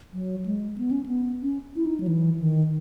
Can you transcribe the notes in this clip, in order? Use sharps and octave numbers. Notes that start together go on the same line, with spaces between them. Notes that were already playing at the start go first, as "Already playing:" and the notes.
F#3
G#3
B3
C#4
B3
C#4
E4
D#4
F#3
E3
D#3